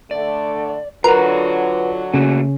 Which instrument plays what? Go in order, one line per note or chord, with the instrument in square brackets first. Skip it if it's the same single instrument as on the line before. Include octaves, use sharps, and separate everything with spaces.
[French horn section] D3 A3 [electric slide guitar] D5
[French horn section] D3 F#3 [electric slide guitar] F4 F#5 [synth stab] A#4 [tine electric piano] B4
[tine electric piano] C#3 C#4 [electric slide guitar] A3 A#3 F#4